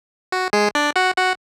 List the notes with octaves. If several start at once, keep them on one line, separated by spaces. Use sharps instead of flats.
F#4
G#3 G#4
D4 D5
F#4 F#5
F#4 F#5